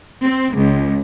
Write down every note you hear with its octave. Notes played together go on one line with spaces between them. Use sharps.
C4
C#2